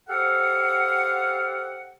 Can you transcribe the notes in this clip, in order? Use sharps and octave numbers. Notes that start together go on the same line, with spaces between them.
G4 A4 C5 F5 F#5